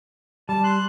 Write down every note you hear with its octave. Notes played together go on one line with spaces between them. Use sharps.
G3 A5
C6 F#6